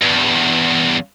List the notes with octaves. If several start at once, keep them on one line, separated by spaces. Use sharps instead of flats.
E2 G2